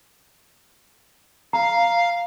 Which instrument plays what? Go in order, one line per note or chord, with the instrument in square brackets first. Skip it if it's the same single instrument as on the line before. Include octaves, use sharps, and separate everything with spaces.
[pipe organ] F5 [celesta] A#5